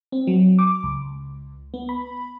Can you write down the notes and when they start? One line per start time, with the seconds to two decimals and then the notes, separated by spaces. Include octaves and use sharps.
0.12 C4
0.27 F#3
0.59 D6
0.83 C#2
1.74 B3
1.89 B5